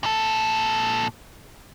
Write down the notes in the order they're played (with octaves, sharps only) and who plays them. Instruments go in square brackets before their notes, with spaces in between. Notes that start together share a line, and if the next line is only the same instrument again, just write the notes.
[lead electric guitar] A#2 A4